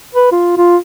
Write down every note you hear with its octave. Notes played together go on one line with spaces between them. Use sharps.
B4
F4
F4